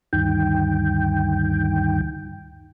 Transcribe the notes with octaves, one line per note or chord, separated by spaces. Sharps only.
D2 G2 D#3 G5